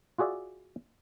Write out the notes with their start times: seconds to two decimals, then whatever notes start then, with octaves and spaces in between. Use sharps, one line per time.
0.18 F4 F#4 G#4 D5 E5